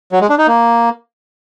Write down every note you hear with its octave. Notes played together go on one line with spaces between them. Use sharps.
F#3
G#3
D4
D#4
A#3